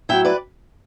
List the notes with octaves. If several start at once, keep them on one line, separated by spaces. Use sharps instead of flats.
A2 F#3 C#4 E4 E5 G5
B4 D5